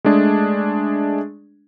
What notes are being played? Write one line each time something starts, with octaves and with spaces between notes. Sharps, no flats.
G#3 A3 D4 G#4